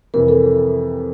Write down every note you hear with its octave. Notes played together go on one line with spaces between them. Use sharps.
F2 C3 E3 A#4
A4